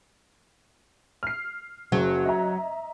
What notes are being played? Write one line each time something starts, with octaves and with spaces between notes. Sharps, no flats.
F6 C7
F#1 F#3
D#5 E5 A#5